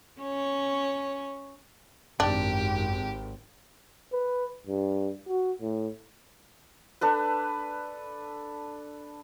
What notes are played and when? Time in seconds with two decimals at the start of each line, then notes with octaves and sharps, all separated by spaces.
0.21 C#4 C#5
2.20 G#1 F#2 D4 G4
4.13 B4
4.67 G2
5.28 F#4
5.61 A2
7.01 D4 A4 B4